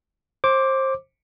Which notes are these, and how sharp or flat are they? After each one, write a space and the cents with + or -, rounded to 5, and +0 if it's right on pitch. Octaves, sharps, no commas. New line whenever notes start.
C5 +25 D6 -5